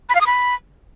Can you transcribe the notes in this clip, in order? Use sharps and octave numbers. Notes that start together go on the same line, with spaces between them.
B5
F5
D#6
B5